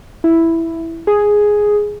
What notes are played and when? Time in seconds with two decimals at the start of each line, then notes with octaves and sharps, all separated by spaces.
0.24 E4
1.07 G#4